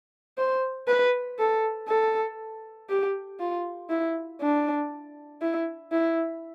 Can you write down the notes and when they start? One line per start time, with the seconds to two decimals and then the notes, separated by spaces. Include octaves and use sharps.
0.38 C5
0.88 B4
1.39 A4
1.88 A4
2.89 G4
3.40 F4
3.90 E4
4.41 D4
5.41 E4
5.92 E4